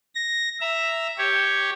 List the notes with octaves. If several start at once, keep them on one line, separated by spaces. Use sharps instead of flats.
A#6
E5 A#5
G4 C#5